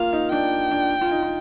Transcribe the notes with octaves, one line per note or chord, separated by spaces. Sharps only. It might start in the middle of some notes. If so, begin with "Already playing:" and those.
Already playing: A#3 F4 F5
D#4
D4 G5
D4
F4
D#4
F4